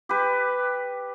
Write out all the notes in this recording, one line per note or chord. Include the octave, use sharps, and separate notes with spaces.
G4 B4